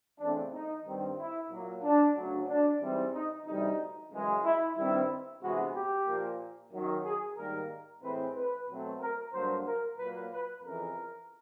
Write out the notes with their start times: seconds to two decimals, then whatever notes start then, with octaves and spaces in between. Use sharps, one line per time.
0.19 E2 C#3 E3 A3 C4 D4
0.52 D#4
0.85 G2 D#3 G3 C4
1.18 E4
1.50 A#2 F#3 A#3
1.83 D4
2.16 D2 C#3 F#3
2.48 D4
2.80 G#2 E3 G3 C4
3.13 D#4
3.46 D2 C3 E3 G3 D#4
4.11 F#2 C#3 E3 G#3
4.44 E4
4.76 G2 D#3 G3 C4 E4
5.42 D2 C3 E3 G#3 B3 F#4
5.74 G4
6.07 A#2 F3 A#3
6.72 F#2 D#3 F#3
7.05 G#4
7.37 G#2 D#3 G3 A#3 A#4
8.02 A2 E3 G#3 C4 B4
8.35 B4
8.68 B2 F#3 A3 C4
9.00 A#4
9.33 G2 D3 F#3 A#3 C5
9.66 A#4
9.98 A#2 F#3 A#3 B4
10.31 B4
10.64 F2 C#3 E3 A#4